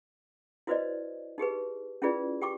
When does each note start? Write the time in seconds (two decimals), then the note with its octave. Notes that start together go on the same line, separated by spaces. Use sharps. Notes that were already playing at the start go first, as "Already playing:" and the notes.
0.67 E4 F#4 B4 C5 D5 D#5
1.38 D#4 G4 G#4 B4
2.02 C#4 E4 F4 G#4 B4 D5
2.41 G4 G5 C#6 D6